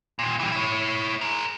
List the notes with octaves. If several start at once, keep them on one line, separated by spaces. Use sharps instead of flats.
D#2 A#2
E3 G3
E4 C#5
G#4 A#4